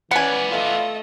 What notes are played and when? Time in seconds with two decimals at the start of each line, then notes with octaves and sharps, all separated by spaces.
0.11 E3 B3 C#4 B4 D5 F#5 G#5
0.51 A3 F4 D#5